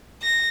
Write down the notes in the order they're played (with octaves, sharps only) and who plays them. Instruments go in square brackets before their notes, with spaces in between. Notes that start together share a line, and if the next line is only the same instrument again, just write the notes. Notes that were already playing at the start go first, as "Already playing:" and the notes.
[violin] A#6